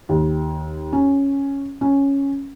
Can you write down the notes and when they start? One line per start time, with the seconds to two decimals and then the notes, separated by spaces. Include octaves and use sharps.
0.09 D#2
0.93 C#4
1.81 C#4